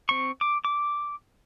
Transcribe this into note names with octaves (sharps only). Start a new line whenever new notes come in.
C4 C#6
D6
D6